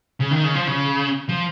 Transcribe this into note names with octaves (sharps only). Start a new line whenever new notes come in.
C#3
D#3
C#3
F3
C#3
F3